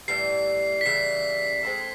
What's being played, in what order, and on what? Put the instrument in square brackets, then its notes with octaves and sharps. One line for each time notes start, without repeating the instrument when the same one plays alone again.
[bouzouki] A2 E3 G3 [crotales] C7
[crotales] B6
[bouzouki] C#3 E3 G3 [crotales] C7
[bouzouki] G#3 C4 E4 A4